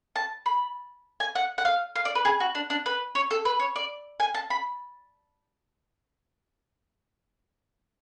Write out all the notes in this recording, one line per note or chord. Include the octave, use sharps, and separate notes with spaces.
A5
B5
G#5
F#5
F#5
F5
F5
D5
B4
G#4
F#4
D4
D4
B4
C#5
A4
B4
C#5
D5
G#5
A5
B5